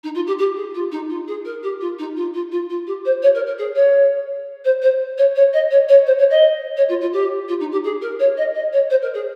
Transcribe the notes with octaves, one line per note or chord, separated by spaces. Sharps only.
D#4
F4
G4
G4
G#4
F4
D#4
F4
G#4
A#4
G4
F4
D#4
F4
F4
F4
F4
G4
C5
C#5
A#4
A#4
G#4
C#5
C5
C5
C#5
C#5
D#5
C#5
C#5
C5
C#5
D#5
C#5
F4
F4
G4
F4
D#4
G4
G#4
A#4
C#5
D#5
D#5
C#5
C5
A#4
G#4